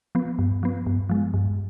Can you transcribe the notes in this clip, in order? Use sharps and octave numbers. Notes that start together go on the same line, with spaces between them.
F3 B3
G2
F3 B3
G2
F3 G#3
G2